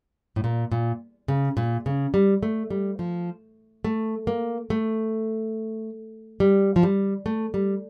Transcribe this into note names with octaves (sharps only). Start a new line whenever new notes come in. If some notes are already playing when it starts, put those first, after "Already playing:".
A2
A#2
A#2
C#3
A#2
C#3
G3
A3
G3
F3
A3
A#3
A3
G3
F3
G3
A3
G3